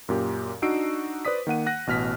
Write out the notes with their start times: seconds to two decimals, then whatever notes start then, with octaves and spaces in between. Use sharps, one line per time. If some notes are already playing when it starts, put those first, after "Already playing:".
0.09 F#2 A#2 G4
0.62 D4 D#4 F#4 E6 C7 D7
1.25 B4 C5 D5 D#6 B6
1.47 D#3 A#3 F#5 D#7
1.66 F#5 F#6 A#6
1.87 A1 B2 F6 B6